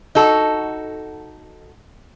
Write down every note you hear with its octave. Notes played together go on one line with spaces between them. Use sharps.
D#4 F#4 A4